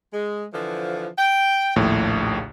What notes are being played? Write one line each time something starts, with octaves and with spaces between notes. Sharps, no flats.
G#3
D3 E3 F3
G5
A#1 D#2 A2 C#3